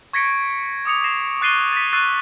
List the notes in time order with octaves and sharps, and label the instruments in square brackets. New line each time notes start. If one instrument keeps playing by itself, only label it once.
[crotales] C#6 G#6 A#6 B6 C#7 D7
D6 D#6 C#7 F7
A#6 C7 E7
C#6 F#6 A6 C7 D#7 G7
A6 B6
C#6 E6 F#6 A6 C7 D#7